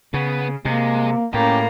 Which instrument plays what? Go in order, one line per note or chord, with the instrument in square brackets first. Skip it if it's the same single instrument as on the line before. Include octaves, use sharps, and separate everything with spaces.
[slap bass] C#3 [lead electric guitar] B3
[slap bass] C3 [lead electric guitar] G#3 [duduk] A#3
[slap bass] A2 [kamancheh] A#3 A#5 [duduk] C#4 [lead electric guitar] G4